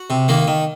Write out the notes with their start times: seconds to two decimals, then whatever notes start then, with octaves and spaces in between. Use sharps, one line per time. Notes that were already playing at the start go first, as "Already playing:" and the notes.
Already playing: F#4
0.10 C3
0.28 D#3 A#3
0.47 D#3